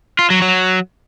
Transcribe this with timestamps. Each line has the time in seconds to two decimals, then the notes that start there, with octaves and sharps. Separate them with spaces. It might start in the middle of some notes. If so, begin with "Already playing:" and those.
0.19 F4
0.30 F#3
0.42 F#3